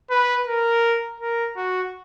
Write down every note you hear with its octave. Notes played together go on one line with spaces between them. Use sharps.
B4
A#4
A#4
F#4